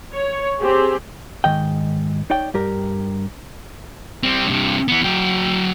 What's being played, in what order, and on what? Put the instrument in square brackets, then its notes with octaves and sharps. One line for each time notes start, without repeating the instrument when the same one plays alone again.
[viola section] C#5
C4 G4 G#4
[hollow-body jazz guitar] G#2 D#3 D#5 G5
D#4 C#5 D5 G5
G2 G4 A#4
[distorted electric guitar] G3 C4
G2 C3
E3 B3
F#3 G5